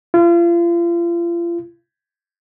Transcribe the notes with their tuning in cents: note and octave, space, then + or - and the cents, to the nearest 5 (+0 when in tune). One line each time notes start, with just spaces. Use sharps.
F4 -35